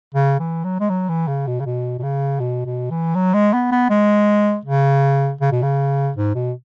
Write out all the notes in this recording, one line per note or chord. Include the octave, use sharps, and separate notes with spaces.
C#3
E3
F#3
G#3
F#3
E3
C#3
B2
C#3
B2
B2
C#3
B2
B2
E3
F#3
G#3
B3
B3
G#3
C#3
C#3
B2
C#3
G#2
B2